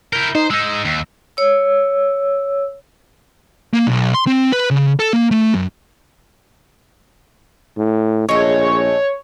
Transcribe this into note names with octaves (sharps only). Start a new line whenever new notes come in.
E4 A#4 G6
D#4 C5
G#3 D#4 E6
D#2
C#5 E6
A#3
B1
C6
C4
B4
C#3
A4
A#3
A3
F#2
A2
A#1 G#3 A3 C#5